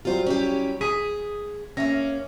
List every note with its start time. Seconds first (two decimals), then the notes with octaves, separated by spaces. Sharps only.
0.05 F#3 G3 F4 F#4 C5
0.27 C#4 E4 G4
0.81 G#4 D#6 B6 D#7
1.77 A#3 C#4 E5 A#6